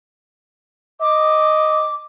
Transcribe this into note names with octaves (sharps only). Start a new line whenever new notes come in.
D#5 D6